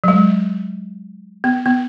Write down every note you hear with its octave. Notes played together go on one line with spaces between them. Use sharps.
F#3
G#3
B3
B3